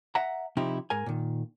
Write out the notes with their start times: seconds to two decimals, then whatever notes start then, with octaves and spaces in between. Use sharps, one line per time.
0.15 E5 F#5 A#5
0.57 C3 F3 C4 D#4 E4 G4
0.90 G#2 A#4 G#5
1.06 A#2 D#3